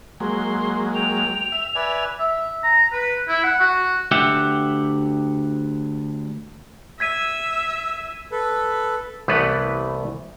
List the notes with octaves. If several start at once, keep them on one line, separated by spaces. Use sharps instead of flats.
F#3 G#3 A#3 C6
G5 F7
E5
B4 D5 E5 G#5
E5
A#5
B4
E4
F#5
F#4
D2 G4 E5 F#5
E5 G#6 B6 D#7
A4 B4
C2 E3 A3 B3 B4